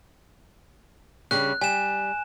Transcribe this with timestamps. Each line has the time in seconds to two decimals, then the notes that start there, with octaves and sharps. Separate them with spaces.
1.31 C#3 G3 D4 F#6
1.61 G3 G#5 E7